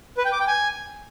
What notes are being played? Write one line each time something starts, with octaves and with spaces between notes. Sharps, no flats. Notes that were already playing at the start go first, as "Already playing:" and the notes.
B4
G5
D6
G5
G#5